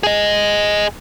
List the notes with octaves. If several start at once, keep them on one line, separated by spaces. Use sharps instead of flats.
G#4 D#5